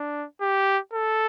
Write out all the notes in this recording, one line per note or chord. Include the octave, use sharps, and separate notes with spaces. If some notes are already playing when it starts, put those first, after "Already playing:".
Already playing: D4
G4
A4